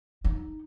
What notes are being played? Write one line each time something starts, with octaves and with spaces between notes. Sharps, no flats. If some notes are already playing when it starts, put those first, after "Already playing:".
D#4